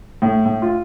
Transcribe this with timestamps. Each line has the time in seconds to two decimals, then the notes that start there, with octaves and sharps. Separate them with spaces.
0.22 A2
0.45 A2
0.62 F4